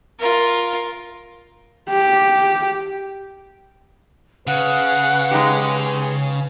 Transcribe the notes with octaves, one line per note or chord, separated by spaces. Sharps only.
F4 A#4
G4
C#3 B4 F#5
G#3 D#4 G4